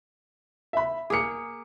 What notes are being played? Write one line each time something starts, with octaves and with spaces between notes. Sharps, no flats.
E5 B5
A#3 G#4 D6 C#7